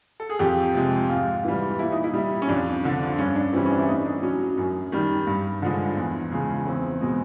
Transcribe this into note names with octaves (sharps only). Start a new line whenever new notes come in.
A4
G#4
F2 G4
C3 F3 G#3
G#2 F4
E3 G3
A#2 E4
D#4
E4
G3
C#4
F2 D4
D3 F3
G2 C#4
D4
E3 G3 C4
C#4
D4
E4
A2 D#4
D4
F#3 C#4
F#2
D#3 G3
G2
D3 F3 G#3
E2
C#3 F3 G#3
E2 C4
B2 G#3